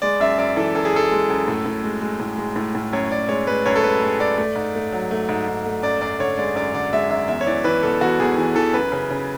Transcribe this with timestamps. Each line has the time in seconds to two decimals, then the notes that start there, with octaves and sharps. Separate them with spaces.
0.02 G#3 D5
0.20 F#2 E5
0.38 F#2 D5
0.56 E3 A4
0.75 F#2 A4
0.85 G#4
0.93 F#2 A4
1.11 G#3
1.29 F#2
1.48 A2
1.66 A2
1.83 G#3
2.02 G#3
2.20 A2
2.38 G#3
2.56 A2
2.75 A2
2.93 F#2 C#5
3.12 F#2 D5
3.29 G#3 C#5
3.47 G#3 B4
3.66 F#2 C#5
3.76 A4
3.83 G#3 B4
4.02 G#3
4.19 F#2 D5
4.37 A3
4.56 G#2
4.75 A3
4.92 F#3
5.11 A3
5.29 G#2
5.47 G#2
5.65 A3
5.83 F#2 D5
6.01 F#2 D5
6.19 D3 C#5
6.38 G#3 D5
6.56 F#2 D5
6.74 D3 D5
6.93 G#3 E5
7.10 F#2 E5
7.28 E2 E5
7.41 C#5
7.47 E3 D5
7.64 E3 B4
7.83 E2 A4
8.01 E2 F#4
8.20 E2 G#4
8.37 E3 G#4
8.55 E3 A4
8.73 F#2 B4
8.92 C#3
9.10 C#3